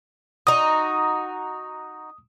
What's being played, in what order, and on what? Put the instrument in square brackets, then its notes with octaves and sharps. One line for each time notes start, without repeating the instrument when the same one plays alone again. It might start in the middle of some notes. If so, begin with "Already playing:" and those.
[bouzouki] D#4 F#4 [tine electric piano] D#6